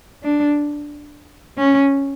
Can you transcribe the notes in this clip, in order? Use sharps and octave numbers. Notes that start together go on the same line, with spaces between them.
D4
C#4